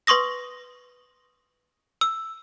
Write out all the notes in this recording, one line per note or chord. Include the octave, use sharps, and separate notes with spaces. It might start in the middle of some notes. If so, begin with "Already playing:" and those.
B4 C6 C#6 D#6 A#6
E6